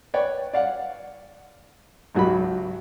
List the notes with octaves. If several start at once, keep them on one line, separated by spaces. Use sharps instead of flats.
B4 C#5 D5 G5
D5 F5 F#5
G#1 C#2 F#3 F#4 G4 B5